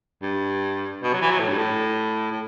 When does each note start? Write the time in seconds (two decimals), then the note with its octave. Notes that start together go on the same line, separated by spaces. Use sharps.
0.22 G2
1.03 B2
1.13 F#3
1.21 E3
1.30 F#3
1.39 A2
1.49 G2
1.58 A2
2.32 A2